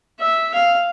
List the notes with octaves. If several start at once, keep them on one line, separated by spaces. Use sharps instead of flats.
E5
F5